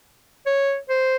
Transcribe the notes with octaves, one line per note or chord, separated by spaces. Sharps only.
C#5
C5